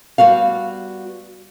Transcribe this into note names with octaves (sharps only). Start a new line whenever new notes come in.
G3 B3 F#4 F5